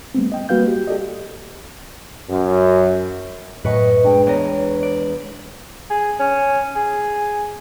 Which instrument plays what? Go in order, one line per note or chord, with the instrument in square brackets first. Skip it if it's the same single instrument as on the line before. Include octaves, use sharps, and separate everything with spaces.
[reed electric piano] G3 A3 B3 C4
D#5 G5
G3 A#3 F#4 B4 F5 G6
G4
G4 A4 D5 D#5
[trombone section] F#2
[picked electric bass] F#2 A2 [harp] B4 C#6 [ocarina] D#5
[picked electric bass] G#3 D4 [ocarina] G5
[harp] E2 A#5 [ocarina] C#5
[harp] D5
[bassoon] G#4
C#4
G#4